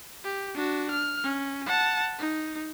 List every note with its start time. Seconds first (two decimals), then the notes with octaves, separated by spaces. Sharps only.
0.24 G4
0.55 D4 F#4
0.91 F6
1.24 C#4
1.66 F#5 A5
2.19 D#4